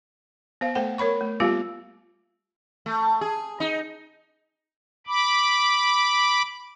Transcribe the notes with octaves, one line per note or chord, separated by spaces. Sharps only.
B3 C5 F5
A3 A4 C5 F#5 G5
A#4 C#5 B5 C#6
A3
G3 A#3 B3 F4 G4 F5
A3
G#4
D#4
B5 D6